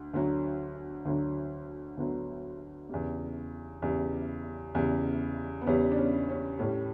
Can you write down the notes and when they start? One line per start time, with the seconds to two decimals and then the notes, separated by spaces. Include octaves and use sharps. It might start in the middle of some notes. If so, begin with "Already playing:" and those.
Already playing: D2
0.14 D2 D3 F#3
1.05 D2 D3 F#3
1.97 D2 D3 F#3 B3
2.89 E2 C#3 G3
3.82 E2 C#3 G3
4.75 E2 C#3 G3
5.61 B3
5.67 E2 C#3 G3 C#4
5.91 D4
5.98 C#4
6.29 C#4
6.59 A2 G3 C#4